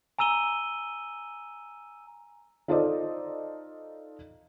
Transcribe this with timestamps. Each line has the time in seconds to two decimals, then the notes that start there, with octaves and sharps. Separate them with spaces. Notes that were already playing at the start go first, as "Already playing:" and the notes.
0.19 G#5 A#5 E6 D#7 G7
2.68 D#4 F4 A4 C5 D5 D#5